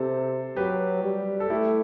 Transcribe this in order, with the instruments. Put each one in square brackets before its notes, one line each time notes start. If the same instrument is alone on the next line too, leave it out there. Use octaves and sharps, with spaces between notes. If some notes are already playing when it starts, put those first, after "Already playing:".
Already playing: [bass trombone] C3 [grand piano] A4 C5
[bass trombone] F#3 [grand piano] G4 B4
[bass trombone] G3
[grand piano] A4
[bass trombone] A3 [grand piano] E4 G4